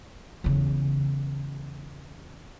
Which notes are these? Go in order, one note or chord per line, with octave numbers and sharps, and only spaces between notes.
E2 C#3